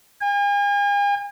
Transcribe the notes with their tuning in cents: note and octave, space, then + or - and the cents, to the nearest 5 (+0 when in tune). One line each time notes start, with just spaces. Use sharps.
G#5 -40